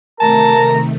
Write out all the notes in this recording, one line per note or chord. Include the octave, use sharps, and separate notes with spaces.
C3 D#3 A3 A#4 A5 A#5